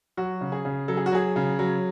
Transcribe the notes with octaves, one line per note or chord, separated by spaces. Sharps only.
F#3 F#4
C#3
G#4
C#3
F#3 A4
G#4
F#4
F#3 G#4
C#3
F#3